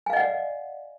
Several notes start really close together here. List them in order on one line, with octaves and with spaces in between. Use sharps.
G#5 F5 D#5 F#5 D5